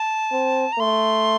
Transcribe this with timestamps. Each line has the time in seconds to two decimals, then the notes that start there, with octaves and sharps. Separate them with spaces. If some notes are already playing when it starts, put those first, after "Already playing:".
Already playing: A5
0.32 C4
0.73 A#5
0.79 A3 C6